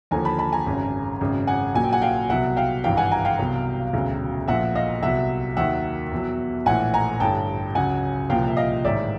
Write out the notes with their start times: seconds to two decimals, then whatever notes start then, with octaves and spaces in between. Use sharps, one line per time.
0.11 D#2 D3 F3 G#5 A#5
0.25 A5 B5
0.39 A5 B5
0.52 G#5 A#5
0.66 G#1 F#2 C#3
1.21 G#1 F#2 C#3
1.47 F#5 G#5
1.74 A#1 A#2 F#3 G#5
1.84 G5
1.92 F#5 G#5
2.02 F5 G5
2.29 C2 B2 F#3 E5 F#5
2.56 F5 G5
2.84 G#1 G2 E3 F5 G5
2.97 F#5 G#5
3.11 G#5 A#5
3.25 F5 G5
3.39 C2 B2 F#3
3.93 E1 D2 C#3 F#3
4.48 A#1 A#2 F3 E5 F#5
4.75 D#5 F5
5.02 C2 B2 F#3 E5 F#5
5.57 D#2 D#3 F#3 E5 F#5
6.11 E2 B2 F#3
6.66 A#1 A2 E3 F#5 G#5
6.94 G#5 A#5
7.20 A1 G2 D3 G5 A5
7.75 C#2 C#3 F#3 F#5 G#5
8.30 C2 A#2 F3 F5 G5
8.47 E5
8.57 D#5 F5
8.84 A1 G#2 D#3 D5 E5